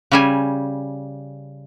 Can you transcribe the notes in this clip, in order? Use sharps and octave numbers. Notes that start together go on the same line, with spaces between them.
C#3 G3 G#5